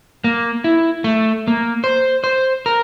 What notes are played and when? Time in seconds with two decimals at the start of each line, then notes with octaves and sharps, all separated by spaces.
0.24 A#3
0.64 E4
1.04 A3
1.48 A#3
1.84 C5
2.24 C5
2.66 A#4